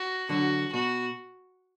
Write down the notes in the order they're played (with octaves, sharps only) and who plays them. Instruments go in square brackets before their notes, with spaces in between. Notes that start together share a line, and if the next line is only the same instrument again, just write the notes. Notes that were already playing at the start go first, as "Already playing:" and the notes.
Already playing: [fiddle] F#4
[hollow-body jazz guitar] D3 F#3 [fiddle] F#4
[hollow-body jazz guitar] B2 [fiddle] F#4